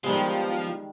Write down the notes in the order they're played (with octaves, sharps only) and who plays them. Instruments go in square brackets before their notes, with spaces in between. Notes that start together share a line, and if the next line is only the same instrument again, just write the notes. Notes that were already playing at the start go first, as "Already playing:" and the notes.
[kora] D#3 G3 G#3 [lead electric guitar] F3 [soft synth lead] B3